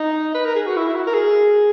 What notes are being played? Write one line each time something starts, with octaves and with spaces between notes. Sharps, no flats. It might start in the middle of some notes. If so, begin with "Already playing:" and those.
Already playing: D#4
B4
A#4
G#4
F#4
E4
E4
F#4
A#4
G#4